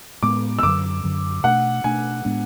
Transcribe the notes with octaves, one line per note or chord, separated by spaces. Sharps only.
A2 G#3 B3 D6
E6
F#2 D3 F#3 D6
F#2 D3 F#3
B2 A3 D4 F#5
B2 A3 D4 G#5
A2 G#3 B3 D4